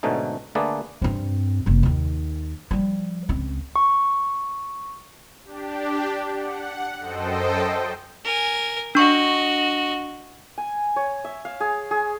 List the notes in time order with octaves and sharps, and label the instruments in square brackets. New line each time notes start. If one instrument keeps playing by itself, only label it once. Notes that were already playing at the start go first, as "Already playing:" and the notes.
[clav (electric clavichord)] G#2 B2 D3 A3 C#4 D#4
D3 A3 A#3 G#4 B4 D5
[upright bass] G2 C4
F#1 C3
D#2 D#3
F3 G3
C#2 C4
[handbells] C#6
[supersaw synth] D4 G4
F#5
F#2 A4 C5 D#5 G5
[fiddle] A#4 G#5
[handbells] D4 C#6 [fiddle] F#4 D#5
[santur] G#5
C#5
E5
F5
G#4
G#4